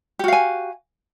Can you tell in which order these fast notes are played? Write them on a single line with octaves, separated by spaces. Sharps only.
G4 F#4 F5 G#5